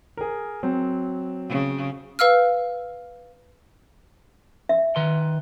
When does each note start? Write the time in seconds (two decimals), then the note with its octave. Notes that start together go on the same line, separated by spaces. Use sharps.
0.17 G#4 A#4
0.63 F#3 C4
1.49 C#3
2.19 B4 F5 E6 F6
4.69 E5
4.96 D#3 B4 C6